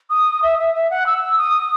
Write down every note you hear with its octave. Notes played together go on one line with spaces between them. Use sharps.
D#6
E5
E5
E5
F#5
E6
D#6